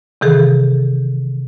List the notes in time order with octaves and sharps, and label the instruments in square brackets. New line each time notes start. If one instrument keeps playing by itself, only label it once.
[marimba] C3 D#3 E3 G#4 A4